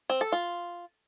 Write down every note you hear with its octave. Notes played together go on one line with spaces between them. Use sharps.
C4
A4
F4